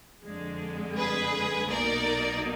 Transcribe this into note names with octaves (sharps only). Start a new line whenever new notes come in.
F2 D3 G#3
G#4 B4
B1 B2 A#3 D#4 A#4 D5